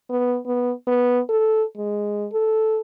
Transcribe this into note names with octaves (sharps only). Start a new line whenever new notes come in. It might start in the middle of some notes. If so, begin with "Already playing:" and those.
B3
B3
B3
A4
G#3
A4